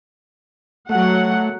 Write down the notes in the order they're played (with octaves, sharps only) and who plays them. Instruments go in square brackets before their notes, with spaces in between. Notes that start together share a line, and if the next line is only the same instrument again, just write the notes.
[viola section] F#3 F#5 [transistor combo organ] A3